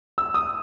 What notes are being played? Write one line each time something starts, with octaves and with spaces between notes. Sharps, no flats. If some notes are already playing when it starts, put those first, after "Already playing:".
E6
D#6